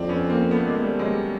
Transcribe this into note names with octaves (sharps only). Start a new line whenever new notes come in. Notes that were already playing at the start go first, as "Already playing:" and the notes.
Already playing: F2 C4 D4
B3 C#4
A#3 C4
A3 B3
G#3 A#3
G3 A3
F#3 G#3